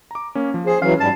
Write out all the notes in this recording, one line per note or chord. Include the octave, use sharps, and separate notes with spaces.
A#5 D6
A#3 C#4
F3
G#4 C5
E3 F#3 C#4 F5
G#2 G3 A5